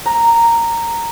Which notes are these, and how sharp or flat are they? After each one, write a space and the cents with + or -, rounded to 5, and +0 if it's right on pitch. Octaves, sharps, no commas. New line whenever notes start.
A#5 -10